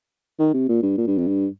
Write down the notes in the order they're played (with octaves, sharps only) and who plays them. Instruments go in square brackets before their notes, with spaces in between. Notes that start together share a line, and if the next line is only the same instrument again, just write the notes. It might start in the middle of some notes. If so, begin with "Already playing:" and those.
[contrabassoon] D#3
C3
A#2
G2
A#2
G2
F2
G2